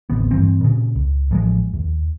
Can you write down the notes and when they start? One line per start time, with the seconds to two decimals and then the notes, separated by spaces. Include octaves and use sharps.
0.10 D1 A1 C3 B3
0.31 G2 E3 C4
0.61 A#2 C#3
0.95 C#2
1.31 A1 F3 G#3
1.74 D#2